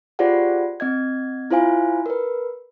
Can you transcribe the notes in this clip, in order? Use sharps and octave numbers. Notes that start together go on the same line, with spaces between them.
F4 G4 G#4 C5 D5 F#5
C4 D#5 G#6
E4 F4 C5 F5 G#5
A#4 B4